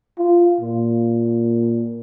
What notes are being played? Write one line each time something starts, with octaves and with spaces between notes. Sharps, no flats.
F4
A#2